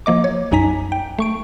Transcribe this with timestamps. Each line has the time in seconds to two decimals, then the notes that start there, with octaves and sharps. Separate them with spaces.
0.06 F3 A#3 D#5 D6
0.24 C#5
0.51 B1 F#2 D#4 G#5 A#5 B6
0.92 G5
1.19 A3 C#6 D7